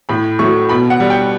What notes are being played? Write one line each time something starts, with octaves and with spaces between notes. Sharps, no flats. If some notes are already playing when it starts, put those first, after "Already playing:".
A2 B5
F#3 A3 C#6
B2 B5
F#5
G3
G5